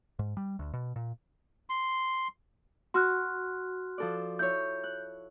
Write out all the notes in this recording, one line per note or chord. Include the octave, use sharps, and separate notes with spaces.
G#2
G3
D2
B2
A#2
C6
F#4 C6 F6 F#6
F3 A4 D5
E4 C#5 G6
F#6